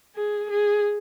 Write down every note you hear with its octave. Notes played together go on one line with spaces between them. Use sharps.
G#4
G#4